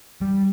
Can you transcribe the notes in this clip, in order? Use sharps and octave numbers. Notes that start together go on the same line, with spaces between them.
G3